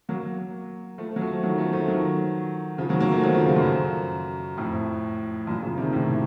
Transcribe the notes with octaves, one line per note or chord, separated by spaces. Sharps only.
F#3 A#3
F3 A3
F#3
F3 A3
D#3 F#3
F3 A3
F3 A3
D#3 F#3
C#3 F3
D#3 F#3
F#3 A#3
F3 A3
D#3 F#3
C#3 F3
A#2 C#3
F#2
F2 A2
F#2 A#2
C#3 F3
C3 D#3
A2 C3